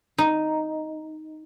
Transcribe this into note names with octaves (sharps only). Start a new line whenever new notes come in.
D#4